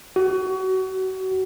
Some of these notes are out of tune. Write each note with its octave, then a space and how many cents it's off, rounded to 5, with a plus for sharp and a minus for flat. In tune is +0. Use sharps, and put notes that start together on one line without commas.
F#4 +30